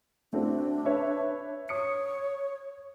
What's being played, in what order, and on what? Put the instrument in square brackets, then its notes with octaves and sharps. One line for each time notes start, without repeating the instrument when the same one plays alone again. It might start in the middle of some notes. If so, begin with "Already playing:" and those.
[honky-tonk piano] A3 C4 F#4 [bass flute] D4
[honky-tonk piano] B4 C#5 E5
[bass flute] C#5 [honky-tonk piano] D#6 C#7